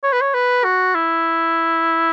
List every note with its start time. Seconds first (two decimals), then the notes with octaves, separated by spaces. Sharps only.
0.03 C#5
0.13 B4
0.21 C#5
0.34 B4
0.64 F#4
0.95 E4